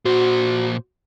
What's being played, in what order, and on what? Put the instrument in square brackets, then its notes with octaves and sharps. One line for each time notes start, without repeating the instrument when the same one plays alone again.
[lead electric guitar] A#2 C5 [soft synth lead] F#4